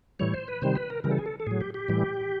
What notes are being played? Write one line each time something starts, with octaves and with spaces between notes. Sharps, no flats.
A2 E3 G3 C#5
C5
B4
C3 D#3 G3 C5
B4
A#4
C#3 E3 G3 A#4
A4
G#4
A4
A4
A2 F#3 G#4
G4
G4
A2 E3 G3